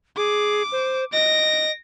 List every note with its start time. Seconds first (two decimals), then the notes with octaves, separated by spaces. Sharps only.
0.17 G#4 D6
0.72 C5
1.13 D#5 A#6 D7